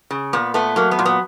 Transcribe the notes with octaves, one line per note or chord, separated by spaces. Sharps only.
C#3
A#2 B3
A3 B3
F#3 A#3
B3
A#2
B3